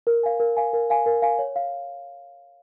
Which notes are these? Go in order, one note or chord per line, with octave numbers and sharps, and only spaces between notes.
A#4
F5 G#5
A#4
F5 G#5
A#4
F5 G#5
A#4
F5 G#5
C#5
F5